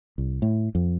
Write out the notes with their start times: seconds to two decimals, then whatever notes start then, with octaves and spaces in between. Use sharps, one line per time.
0.18 C2
0.42 A2
0.75 F2